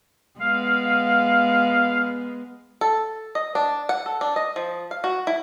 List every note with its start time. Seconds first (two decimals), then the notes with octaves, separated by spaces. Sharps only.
0.40 G#3 B3 F5
2.81 A4
3.35 D#5
3.55 D4
3.89 F#5
4.06 A4
4.21 D4
4.36 D#5
4.56 F3
4.91 F5
5.04 F#4
5.27 E4